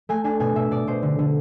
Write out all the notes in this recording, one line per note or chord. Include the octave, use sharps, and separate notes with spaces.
A3 G#5
D4 G#5
B2 G#5
B2 E5
B2 D5
B2 C5
D3
D3